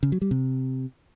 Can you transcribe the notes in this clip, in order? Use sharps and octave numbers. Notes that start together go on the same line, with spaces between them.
C#3
F#3
G3
C3